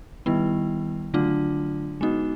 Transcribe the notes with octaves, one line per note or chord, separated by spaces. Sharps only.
D#3 G3 B3 E4
D3 F#3 A3 D4 F4
G#3 B3 D#4 F#4